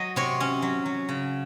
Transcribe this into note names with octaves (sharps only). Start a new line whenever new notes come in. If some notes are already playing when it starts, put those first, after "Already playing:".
Already playing: F#3 D#5
C3 C#5
C#4
F#3
F#3
C#3